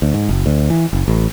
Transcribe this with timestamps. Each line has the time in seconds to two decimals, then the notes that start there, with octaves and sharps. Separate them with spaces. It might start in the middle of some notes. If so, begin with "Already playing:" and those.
0.02 D2
0.14 G#2
0.29 F#1
0.46 D2
0.70 E3
0.93 F#1
1.08 A1